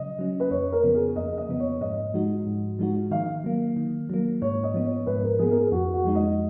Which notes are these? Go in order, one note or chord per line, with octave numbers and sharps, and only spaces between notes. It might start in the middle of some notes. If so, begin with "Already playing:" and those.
Already playing: C#3 F#3 D#5
F#3 C#4
B4
F2 C#5
A#4
C#3 F3 B3
G#4
F2 D#5
D#5
C#3 F3 B3
C#5
G#2 D#5
F3 G#3 D#4 F#4
G#2
F3 G#3 D#4 F#4
D#3 F5
F#3 A#3
D#3
F#3 A#3
G#2 C#5
D#5
F3 B3
C#5
G#2 B4
A#4
F3 B3 G#4
A#4
G#4
F2 F#4
F#4
F3 G#3 D#4
D#5